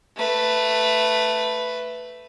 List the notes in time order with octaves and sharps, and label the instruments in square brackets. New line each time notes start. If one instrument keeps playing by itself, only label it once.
[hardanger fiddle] A3 B4